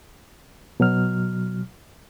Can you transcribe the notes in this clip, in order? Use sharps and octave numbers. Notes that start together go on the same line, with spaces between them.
B2 F#3 F6